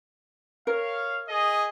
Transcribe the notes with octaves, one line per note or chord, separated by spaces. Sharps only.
A#4 C#5 F5
G#4 D#5